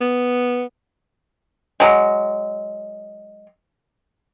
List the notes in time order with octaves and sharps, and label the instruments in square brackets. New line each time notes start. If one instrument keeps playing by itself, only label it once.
[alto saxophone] B3
[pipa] F#3 G#3